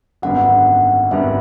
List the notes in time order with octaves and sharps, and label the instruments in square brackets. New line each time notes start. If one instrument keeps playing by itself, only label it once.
[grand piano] G#1 F#2 D3 G3 B3 [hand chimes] F#5
[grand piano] G#1 F#2 D3 G3 B3 [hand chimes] E5